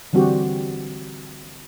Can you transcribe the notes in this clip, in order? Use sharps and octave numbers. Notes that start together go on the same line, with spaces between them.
D3 E3 G3 C4 F#4 G4